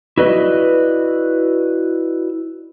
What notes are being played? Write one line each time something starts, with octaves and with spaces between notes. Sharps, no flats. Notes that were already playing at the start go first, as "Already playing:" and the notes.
E4 F#4 B4 D5 D#5